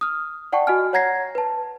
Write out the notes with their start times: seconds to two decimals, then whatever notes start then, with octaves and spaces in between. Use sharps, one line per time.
0.01 D#6 F6
0.52 D5 F#5 G5 A5 C#6
0.67 F#4 D#5 G#5 F6
0.93 C#5 F#5 A#5 G#6 A#6 C7
1.35 B4 A5